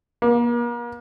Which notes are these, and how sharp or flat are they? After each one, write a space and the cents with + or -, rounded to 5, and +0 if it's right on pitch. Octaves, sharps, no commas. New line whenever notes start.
A#3 +40